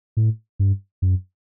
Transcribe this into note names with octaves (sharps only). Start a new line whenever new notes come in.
A2
G2
F#2